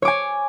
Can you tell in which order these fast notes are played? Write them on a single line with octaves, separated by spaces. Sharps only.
C#5 D6 G#5